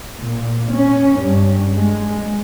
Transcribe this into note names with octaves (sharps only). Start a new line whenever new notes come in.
A#2
C#4
G2
G#3